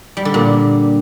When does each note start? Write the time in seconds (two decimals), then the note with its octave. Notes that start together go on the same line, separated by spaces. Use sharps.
0.17 G3
0.25 D3
0.34 A#2